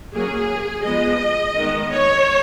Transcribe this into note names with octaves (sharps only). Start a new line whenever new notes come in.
F#3 A#3 C#4 G#4
F3 G#3 B3 D#5
D#3 G#3 B3
C#5